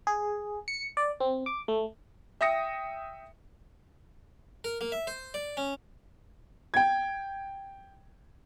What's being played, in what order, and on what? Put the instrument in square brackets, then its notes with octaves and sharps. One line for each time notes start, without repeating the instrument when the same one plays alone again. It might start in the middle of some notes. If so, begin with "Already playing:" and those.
[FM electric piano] G#4
C#7
D5
C4
D6
A3
[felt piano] E5 G5 D#6 A#6 C#7
[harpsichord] A#4
A#3
E5
C5
D5
C#4
[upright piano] G5 G#6